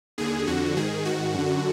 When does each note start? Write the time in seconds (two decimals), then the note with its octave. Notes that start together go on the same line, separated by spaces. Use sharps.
0.18 D#2 D3 G#4
0.47 F2 D3 F#4
0.77 G#2 D#3 G#4
1.05 G#2 D#3 F#4
1.34 F#2 D3